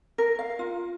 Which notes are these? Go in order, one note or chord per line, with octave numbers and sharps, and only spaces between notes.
A#4
F5
F4